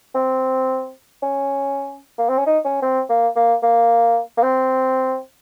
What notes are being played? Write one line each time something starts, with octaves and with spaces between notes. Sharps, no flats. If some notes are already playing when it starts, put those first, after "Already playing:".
C4
C#4
A#3
C4
C#4
D#4
C#4
C4
A#3
A#3
A#3
A#3
C4